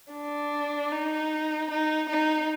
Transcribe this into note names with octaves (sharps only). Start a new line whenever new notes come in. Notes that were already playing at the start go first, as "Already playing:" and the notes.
D4
D#4
D#4
D#4